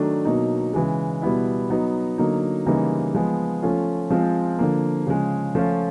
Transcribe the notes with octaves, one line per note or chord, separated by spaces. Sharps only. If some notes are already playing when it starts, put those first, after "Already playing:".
Already playing: D#3 F#3 A3 D4
B2 F#3 A#3 D#4
C#3 E3 G#3
B2 G3 B3 E4
F#3 B3 D#4
D3 F#3 A#3 D#4
C#3 E3 G3 A#3 D#4
F3 G#3 B3
F3 A3 C#4 F4
F3 G#3 C4 F4
D3 F3 A#3
C#3 F3 G#3
F3 A3 C#4 F4